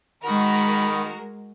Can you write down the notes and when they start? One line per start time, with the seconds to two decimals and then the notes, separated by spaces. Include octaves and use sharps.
0.23 D#3 G#3 F#4 A#4 B5